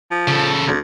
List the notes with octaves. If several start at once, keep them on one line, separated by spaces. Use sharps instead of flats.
F3
C#3 A4
D2